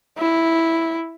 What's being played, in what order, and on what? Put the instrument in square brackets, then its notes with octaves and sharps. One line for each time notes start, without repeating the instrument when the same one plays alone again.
[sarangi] E4